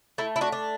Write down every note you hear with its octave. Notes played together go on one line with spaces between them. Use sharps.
A3 E4
E4
D4 F#4
D4